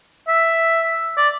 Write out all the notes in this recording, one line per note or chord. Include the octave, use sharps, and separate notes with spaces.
E5
D5